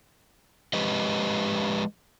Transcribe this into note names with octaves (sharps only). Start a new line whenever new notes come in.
F3 G#3 G4 B4 D#5